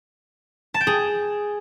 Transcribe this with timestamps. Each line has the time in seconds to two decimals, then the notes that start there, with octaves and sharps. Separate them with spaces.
0.74 A5
0.81 G5
0.87 G#4